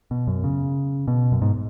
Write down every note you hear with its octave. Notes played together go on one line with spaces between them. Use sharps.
B2
F#2
C#3
B2
F#2
G#2